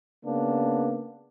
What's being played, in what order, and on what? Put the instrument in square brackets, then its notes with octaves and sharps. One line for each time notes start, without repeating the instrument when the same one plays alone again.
[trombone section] C#3 A#3 B3 D4